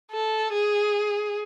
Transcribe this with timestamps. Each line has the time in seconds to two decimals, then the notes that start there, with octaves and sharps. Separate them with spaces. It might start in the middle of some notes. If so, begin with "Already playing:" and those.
0.11 A4
0.53 G#4